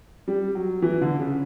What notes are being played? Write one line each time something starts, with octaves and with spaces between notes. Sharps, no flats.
G3
F#3
E3
D3
C#3